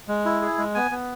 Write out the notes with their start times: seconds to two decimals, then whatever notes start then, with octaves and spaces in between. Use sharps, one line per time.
0.08 G#3
0.25 E4
0.42 G#4
0.58 G#3
0.75 B3 G#5
0.91 B3